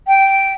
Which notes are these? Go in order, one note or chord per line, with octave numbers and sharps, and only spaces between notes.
G5